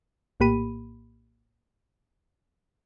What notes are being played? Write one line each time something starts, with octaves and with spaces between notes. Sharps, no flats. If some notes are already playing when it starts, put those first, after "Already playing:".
A#1 A2 A#3 G4 B5 D#7